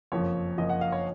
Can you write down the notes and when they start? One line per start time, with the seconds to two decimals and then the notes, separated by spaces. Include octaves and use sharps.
0.12 F#1 F2 F3 C#5
0.58 F#1 F2 F3 D#5
0.69 F#5
0.81 F5
0.92 C#5